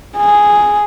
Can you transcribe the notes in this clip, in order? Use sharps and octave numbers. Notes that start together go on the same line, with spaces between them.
G#4